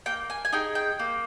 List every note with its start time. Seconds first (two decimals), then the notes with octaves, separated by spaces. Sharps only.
0.06 A#3 G5
0.30 G#5
0.45 G#5
0.53 D#4 G#4 G5
0.75 G5
0.99 A#3